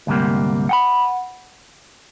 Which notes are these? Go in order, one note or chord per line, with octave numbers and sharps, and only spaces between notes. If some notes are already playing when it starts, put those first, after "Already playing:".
D2 G#2 C3 G3 A#3
F#5 G5 B5